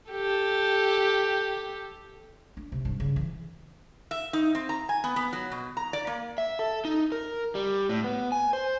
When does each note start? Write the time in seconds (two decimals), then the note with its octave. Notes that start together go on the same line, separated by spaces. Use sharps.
0.10 G4 A4
2.57 D4
2.72 C3
2.85 G2
3.00 C#3
3.16 E3
4.11 E5
4.33 D#4
4.55 C4
4.69 A#5
4.89 G#5
5.04 B3
5.16 B3
5.33 F#3
5.52 B2
5.77 A#5
5.93 D5
6.07 A#3
6.38 E5
6.59 A4
6.85 D#4
7.12 A#4
7.55 G3
7.89 A2
8.04 B3
8.32 G#5
8.53 C5